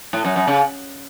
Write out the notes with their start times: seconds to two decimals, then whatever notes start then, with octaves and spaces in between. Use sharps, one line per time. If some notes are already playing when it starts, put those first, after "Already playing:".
0.13 A2
0.25 F#2
0.36 F#2
0.48 C#3